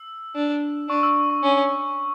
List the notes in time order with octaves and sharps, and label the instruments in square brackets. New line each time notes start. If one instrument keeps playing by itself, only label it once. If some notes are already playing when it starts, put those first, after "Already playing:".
Already playing: [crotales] E6
[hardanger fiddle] D4
[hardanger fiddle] D4 [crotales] C#6
[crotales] E6
C#6
[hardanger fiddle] C#4